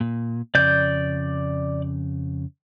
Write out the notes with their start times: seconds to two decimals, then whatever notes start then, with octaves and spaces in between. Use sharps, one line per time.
0.01 A#2
0.55 F2 C#3 D5 G6